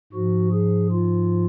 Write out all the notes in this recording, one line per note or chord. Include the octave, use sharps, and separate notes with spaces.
G#2 F3 F#4
G#4
F4